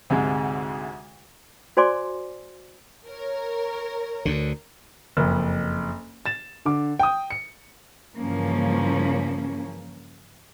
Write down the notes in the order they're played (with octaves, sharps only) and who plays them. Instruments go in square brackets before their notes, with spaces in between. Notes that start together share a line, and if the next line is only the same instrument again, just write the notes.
[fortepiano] D2 G#2 C3 G#3
[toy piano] F#4 C5 D5 G#5 C6 D6
[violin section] A#4 C#5
[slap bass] D2 D3
[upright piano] F#1 F2
A6 E7
D3 D6
G5 D#6
C#7
[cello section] G2 C#3 E3 F3 A#3 C#4